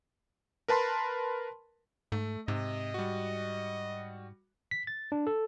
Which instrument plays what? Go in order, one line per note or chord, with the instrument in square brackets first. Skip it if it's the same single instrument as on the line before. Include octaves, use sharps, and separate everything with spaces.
[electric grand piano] A#4 B4 A5 B5 C6
[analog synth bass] G#2 [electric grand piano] A3
[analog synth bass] G#2 [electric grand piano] C3 [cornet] D#5
[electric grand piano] G3 F#4
[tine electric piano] B6
A6
D4
A4